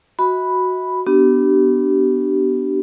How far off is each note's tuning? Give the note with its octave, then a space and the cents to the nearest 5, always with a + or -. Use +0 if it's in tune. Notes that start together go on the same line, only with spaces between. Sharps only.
F#4 -5 E5 -45 B5 +0
B3 +0 D4 +0 G4 -35